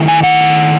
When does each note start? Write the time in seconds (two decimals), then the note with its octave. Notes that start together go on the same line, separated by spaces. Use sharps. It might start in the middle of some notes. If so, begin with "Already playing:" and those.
Already playing: D#3 A3 E4
0.08 G#5
0.23 F#5